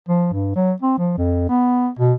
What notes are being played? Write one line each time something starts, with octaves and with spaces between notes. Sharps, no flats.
F3
G2
F#3
C4
F3
F2
B3
B2